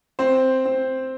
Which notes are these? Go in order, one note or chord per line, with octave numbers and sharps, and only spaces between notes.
C4 C5
C4